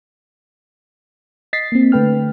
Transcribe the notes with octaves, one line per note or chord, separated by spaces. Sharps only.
D#5 A6 B6 C7
A#3 C4
D3 A3 B4 G5 F6